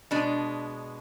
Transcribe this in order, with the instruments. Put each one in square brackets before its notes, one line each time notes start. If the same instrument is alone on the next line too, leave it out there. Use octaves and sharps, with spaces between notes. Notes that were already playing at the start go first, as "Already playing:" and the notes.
[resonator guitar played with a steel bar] B2 G#3 D4